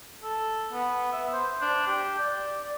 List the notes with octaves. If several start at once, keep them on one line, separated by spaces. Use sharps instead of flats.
A4
B3
E5
C5
D4
G4
D5
D5